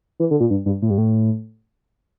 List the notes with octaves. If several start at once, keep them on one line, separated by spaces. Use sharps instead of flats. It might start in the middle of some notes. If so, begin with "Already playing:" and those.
E3
D3
A#2
G2
G2
A2
G2
A2